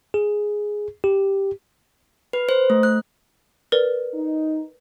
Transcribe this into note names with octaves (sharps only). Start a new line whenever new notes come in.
G#4
G4
B4
C5
A3
F#6
A#4 B4 D5
D#4